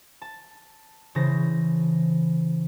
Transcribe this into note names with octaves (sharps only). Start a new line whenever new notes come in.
A5
C#3 E3 C5 A5 A#6